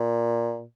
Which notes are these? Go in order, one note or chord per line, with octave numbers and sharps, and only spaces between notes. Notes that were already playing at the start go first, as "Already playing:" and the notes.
Already playing: A#2